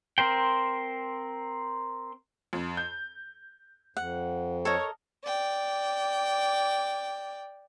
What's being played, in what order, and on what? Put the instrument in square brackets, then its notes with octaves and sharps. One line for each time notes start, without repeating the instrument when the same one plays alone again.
[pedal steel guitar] C4 A#4 C5 G5
[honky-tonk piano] F2
G6
[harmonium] F2 [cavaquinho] F#5
[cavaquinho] A4 A#4 D#5 [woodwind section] C#5
[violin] D5 G5